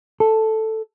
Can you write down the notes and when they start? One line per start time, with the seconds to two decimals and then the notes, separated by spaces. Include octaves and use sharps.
0.20 A4